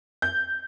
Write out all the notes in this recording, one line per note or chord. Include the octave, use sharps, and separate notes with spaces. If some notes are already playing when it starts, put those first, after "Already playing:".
G6